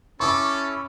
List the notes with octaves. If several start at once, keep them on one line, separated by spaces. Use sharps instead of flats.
C#4 E4 A4 C#6 D6